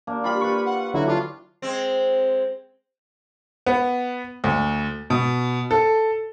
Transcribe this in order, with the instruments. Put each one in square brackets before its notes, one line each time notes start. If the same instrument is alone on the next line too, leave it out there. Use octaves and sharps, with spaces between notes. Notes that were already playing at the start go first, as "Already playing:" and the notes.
[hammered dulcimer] A#3 D4
[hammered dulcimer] G3 F4 [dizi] B5
[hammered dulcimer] B4 C#6
[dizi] F#5
[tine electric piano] D3 F#3 E4 [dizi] F#4
[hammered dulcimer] D4 [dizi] F4
[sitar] G#3 C4
[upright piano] B3
D2
B2
A4